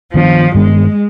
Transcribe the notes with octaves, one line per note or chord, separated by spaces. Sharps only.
G2 D#3 F3 B3 D4
G2 D#3 G#3 B3 D4